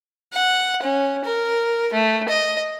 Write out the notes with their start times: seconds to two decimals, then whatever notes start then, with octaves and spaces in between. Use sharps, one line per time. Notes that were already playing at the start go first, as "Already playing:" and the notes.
0.33 F#5
0.83 C#4
1.24 A#4
1.93 A3
2.28 D#5